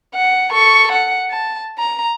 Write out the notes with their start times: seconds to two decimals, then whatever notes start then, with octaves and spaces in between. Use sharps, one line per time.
0.15 F#5
0.51 A4 C#6
0.92 F#5
1.31 A5
1.78 A#5